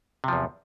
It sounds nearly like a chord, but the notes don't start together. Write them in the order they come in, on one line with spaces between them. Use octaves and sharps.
C3 F3 E2